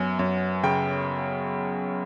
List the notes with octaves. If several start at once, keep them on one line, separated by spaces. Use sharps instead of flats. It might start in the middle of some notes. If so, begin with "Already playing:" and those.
Already playing: F#2 B3 G#5
F#2
C#3 G5